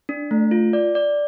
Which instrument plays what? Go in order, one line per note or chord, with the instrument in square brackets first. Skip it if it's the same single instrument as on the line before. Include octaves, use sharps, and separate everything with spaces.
[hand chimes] D4
A3
F4
D5
D5